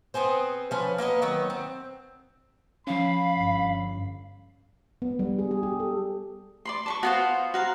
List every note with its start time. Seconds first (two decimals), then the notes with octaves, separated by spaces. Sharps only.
0.14 B3 C4 G#4 C5
0.71 F3 C#4 B4
0.98 A#3 B3 B4 D#5
1.22 D#3 F#3 B3
1.50 C4
2.87 F3 C#4 F5 B5
3.36 G1
5.02 B3
5.19 G3
5.39 G#4
5.51 G#4
5.63 G4
5.80 A4
6.65 D5 B5 C6
6.86 A5 B5 C#6
7.03 B3 F4 F#4 C5
7.54 F#4 F5 A#5